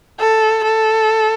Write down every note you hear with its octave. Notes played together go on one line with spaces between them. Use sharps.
A4
A4